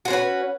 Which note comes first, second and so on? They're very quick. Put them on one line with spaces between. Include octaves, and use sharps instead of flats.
F#4 C5 C#4 B4